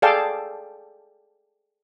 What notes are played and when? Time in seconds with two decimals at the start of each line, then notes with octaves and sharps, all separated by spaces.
0.02 G#4 A4 D5 F5 G5 A5